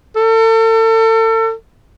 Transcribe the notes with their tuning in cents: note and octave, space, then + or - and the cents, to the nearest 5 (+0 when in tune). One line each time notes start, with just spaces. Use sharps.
A4 +35